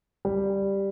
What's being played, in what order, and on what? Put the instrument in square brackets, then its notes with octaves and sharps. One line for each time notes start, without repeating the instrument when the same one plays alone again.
[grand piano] G3